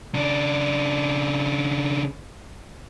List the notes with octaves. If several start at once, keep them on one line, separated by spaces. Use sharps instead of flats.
C#3 D4